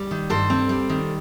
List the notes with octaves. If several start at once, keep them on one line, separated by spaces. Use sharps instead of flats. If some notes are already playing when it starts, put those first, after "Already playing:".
Already playing: G3
D#3
G2 A4 C5
C4
G3
D#3